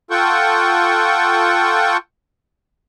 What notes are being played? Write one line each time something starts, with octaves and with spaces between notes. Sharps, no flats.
F4 A4 F#5 G5 C#6